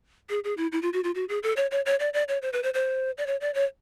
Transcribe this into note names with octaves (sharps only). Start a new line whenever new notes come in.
G#4
G#4
E4
E4
F4
F#4
F4
F#4
G#4
A4
C#5
C#5
C#5
D5
D5
C#5
C5
B4
C5
C5
D5
C#5
D5
C#5